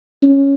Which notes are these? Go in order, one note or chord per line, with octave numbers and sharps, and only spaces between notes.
C#4